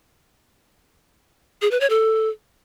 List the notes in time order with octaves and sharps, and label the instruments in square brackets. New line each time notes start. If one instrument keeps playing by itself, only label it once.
[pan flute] G#4
B4
C#5
A4